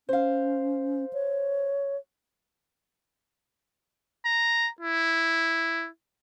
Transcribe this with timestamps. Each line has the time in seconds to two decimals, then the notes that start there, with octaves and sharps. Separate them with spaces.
0.09 C#4 C5 F5
1.13 C#5
4.26 A#5
4.81 E4